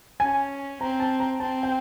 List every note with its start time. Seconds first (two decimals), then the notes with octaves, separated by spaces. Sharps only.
0.20 C#4 G#5
0.81 C4 A#5
1.00 A5
1.20 A#5
1.40 C4 A5
1.63 G5